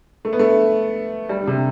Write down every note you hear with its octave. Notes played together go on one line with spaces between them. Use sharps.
A3
B3
A3
G3
D3
C3